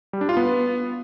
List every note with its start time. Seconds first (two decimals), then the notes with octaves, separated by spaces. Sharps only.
0.13 G3
0.21 D4
0.29 F4
0.37 B3